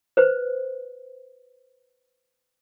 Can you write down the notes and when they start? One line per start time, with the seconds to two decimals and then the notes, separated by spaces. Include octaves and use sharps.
0.17 B4 C5